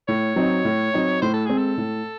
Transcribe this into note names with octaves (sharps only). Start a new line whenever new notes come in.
A2 C#5
F#3 C4 D#4
A2
F#3 C4 D#4
A2 C5
A4
G#3 C4 G#4
A4
A2